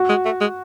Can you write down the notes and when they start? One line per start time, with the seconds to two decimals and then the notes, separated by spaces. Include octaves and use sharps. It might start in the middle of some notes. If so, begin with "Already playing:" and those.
Already playing: F#4
0.09 G#3
0.25 A3
0.41 G#3